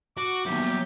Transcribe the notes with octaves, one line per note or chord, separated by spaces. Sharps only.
F#4 D6
F#2 D#3 A#3 B3 G4 E5
F#3 G3